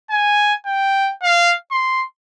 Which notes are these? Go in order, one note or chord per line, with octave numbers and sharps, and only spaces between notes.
G#5
G5
F5
C6